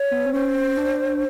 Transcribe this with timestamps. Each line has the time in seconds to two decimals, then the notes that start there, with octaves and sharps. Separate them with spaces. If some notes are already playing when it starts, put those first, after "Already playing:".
Already playing: C#5
0.11 B3
0.26 C4
0.33 C#4 C5
0.77 D4